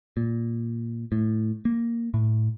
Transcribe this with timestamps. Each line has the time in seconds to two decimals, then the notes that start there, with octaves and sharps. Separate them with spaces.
0.17 A#2
1.12 A2
1.65 A#3
2.14 A2